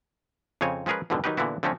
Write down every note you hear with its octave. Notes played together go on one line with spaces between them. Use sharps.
F2 C#3 C4 C#5 G#5
F3 G#3 C#4 G#4 A#4 B4
F2 G#2 B2 D3 D#3
D#3 F#3 D#4 G4 B4
A#2 D3 E3 B3 E4 F#4
D3 F3 A3 C4 C#4